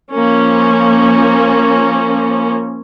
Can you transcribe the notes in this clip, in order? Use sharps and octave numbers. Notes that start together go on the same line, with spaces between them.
F3 A#3 C#4